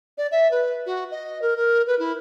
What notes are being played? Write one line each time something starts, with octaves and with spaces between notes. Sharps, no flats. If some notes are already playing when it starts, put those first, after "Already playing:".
D5
E5
B4
F#4
D#5
A#4
A#4
B4
E4